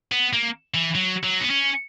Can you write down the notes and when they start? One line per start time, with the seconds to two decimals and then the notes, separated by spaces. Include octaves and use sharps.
0.12 B3
0.33 A#3
0.74 E3
0.95 F#3
1.24 F#3
1.41 B3
1.50 C#4